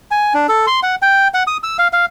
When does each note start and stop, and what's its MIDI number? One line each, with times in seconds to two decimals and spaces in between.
0.11 0.33 80
0.34 0.47 62
0.49 0.66 69
0.67 0.80 84
0.83 0.95 78
1.02 1.28 79
1.34 1.43 78
1.47 1.57 87
1.63 1.77 88
1.79 1.88 77
1.93 2.05 77